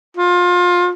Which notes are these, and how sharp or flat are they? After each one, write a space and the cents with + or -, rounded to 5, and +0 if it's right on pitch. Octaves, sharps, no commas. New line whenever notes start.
F4 +25